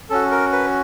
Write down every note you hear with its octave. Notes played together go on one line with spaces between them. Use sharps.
C#4 F#4 A4
A#4
B4